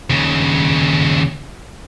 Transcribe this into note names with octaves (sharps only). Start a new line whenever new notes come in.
D#2 C#3